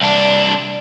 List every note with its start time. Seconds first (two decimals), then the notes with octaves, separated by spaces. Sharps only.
0.01 C2 D4